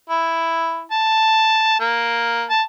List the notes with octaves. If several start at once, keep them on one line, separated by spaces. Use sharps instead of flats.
E4
A5
A#3
A5